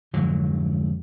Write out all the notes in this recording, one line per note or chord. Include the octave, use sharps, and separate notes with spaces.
F2 G#2 D3 F#3